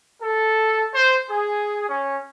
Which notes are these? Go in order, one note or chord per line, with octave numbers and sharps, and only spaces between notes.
A4
C5
G#4
C#4